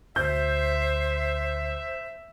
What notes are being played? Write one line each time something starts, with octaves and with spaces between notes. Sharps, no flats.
D2 C5 E5 G6